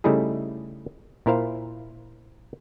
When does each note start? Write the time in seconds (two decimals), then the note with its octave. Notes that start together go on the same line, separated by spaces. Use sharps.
0.04 C#3 G3 A3 D#4 E4 G#4
1.26 A#2 E4 A#4 C5 F5